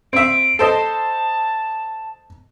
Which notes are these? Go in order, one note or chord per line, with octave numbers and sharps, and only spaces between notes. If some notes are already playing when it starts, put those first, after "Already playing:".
C4 E5 D7
A4 C5 D#5 A5